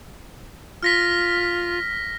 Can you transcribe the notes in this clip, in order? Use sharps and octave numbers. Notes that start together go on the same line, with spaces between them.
F4 F6 A#6 B6